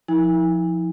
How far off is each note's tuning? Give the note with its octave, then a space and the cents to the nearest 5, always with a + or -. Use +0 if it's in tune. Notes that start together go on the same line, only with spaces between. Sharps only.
F3 +0 E4 -40 G#5 -35